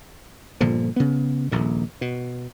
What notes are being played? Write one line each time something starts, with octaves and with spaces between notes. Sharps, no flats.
G1 A#2 D3 F3
C#3 B3
D#1 A#1 A#2
B2